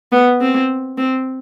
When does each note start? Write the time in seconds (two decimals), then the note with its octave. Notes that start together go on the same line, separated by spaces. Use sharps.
0.12 B3
0.41 C4
0.98 C4